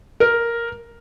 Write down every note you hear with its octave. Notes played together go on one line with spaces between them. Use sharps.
A#4